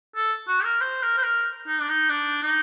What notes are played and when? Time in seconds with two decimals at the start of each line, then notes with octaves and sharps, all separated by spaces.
0.16 A4
0.48 F#4
0.64 A#4
0.81 C5
1.03 A#4
1.18 C5
1.24 A#4
1.67 D#4
1.81 D4
1.89 D#4
2.09 D4
2.43 D#4